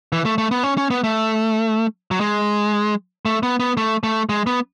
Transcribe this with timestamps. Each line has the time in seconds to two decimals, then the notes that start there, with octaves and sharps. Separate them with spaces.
0.12 E3
0.25 A3
0.38 A3
0.51 B3
0.63 C#4
0.77 C#4
0.90 B3
1.04 A3
2.11 F#3
2.21 G#3
3.25 A3
3.43 B3
3.60 B3
3.77 A3
4.03 A3
4.29 G#3
4.47 B3